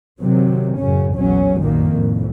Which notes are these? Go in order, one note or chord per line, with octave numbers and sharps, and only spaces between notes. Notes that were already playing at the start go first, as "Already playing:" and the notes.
C3 D#3 F#3
F#2 A2 C#3 C#4
A#1 E2 F#3 C#4
B1 F#2 A#2 D#3 A#3
C2 F2 A2